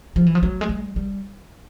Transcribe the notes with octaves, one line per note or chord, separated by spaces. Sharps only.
F3
E3
F3
F#3
G#3
G3
G3